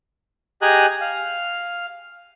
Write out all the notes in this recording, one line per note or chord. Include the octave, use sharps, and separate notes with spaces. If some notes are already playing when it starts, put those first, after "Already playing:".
G4 G#4 D#5 G#5 A#5 F#6
F5